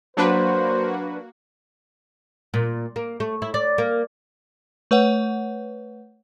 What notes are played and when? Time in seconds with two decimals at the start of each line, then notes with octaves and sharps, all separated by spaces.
0.17 F#3 A#3 D4 F#4 B4 C5
2.54 A#2
2.96 A#3
3.20 A3
3.42 E4
3.54 D5
3.78 A#3
4.91 A3 B4 C#5 F#5